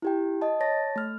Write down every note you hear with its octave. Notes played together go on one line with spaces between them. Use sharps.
E4 G4 G5
D#5 A5
C#5 A5 A6 A#6
A3 F6